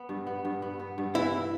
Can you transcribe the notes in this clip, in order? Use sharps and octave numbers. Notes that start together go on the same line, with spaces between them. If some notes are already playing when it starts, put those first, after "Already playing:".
Already playing: B3
G2
B3
G2
B3
B3
G2
E3 E4
E4